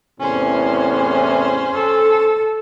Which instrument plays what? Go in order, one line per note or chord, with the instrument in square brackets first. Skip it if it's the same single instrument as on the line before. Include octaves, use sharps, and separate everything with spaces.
[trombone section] E2 A2 C3 [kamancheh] C#4 C5
[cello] A4